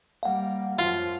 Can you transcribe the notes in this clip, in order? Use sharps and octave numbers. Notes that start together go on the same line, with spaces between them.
G3 A#3 F5 F#5
F#2 F3 F4